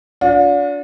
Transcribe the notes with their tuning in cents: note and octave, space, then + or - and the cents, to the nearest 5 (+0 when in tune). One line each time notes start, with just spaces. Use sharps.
D4 -30 F4 +45